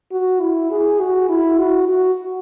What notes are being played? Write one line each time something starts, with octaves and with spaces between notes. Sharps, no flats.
F#4
E4
G#4
F#4
E4
F#4
F#4